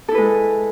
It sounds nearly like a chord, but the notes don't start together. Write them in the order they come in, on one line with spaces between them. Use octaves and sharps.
A4 E4 B4 G#3